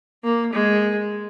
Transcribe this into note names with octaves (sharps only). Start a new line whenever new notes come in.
A#3
G#3